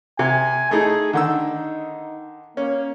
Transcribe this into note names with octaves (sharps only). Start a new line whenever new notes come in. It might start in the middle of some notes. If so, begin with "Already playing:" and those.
C3 G#5
A3 D#4 E4 G#4
D3 D#3 D#4 E6
A#3 C#4